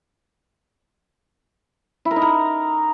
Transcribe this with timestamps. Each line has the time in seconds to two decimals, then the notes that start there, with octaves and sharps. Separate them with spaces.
2.05 E4
2.11 A#4
2.16 D#4
2.22 A#4